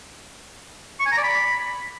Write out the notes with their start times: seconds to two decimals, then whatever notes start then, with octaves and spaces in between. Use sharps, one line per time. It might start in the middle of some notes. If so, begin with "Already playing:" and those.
1.00 C#6
1.06 G#5
1.12 A#5
1.18 D5
1.24 B5